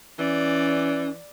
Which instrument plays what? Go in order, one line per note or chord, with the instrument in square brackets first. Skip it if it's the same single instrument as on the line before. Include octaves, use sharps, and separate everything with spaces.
[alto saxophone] E3 [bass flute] C#4 [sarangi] D5